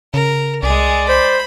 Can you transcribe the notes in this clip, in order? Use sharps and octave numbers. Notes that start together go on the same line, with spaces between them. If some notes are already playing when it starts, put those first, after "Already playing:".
C#3 A#4
C2 G#3 G#4 D5
C5 B5